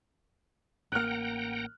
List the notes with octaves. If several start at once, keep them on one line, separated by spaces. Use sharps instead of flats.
A1 A#3 F#5 G5 A#5 F6 F#6